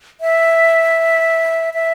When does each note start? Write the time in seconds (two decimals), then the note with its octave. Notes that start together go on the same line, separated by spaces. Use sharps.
0.21 E5
1.74 E5